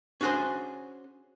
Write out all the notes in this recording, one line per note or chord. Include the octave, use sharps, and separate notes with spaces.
C#4 D4 F#4 G#4 C5